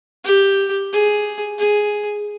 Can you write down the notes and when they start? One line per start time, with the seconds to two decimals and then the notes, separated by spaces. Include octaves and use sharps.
0.24 G4
0.92 G#4
1.59 G#4